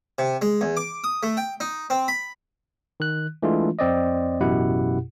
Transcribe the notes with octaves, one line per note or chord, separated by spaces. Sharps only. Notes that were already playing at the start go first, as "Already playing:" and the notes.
C3
G#3
E2
D6
D#6
A3
G5
D#4
C4
B5
D#3 F#6
E3 G#3 A3 D4 F4
F2 C4 D5 D#5
A1 F#2 B2 E4 G4 F#5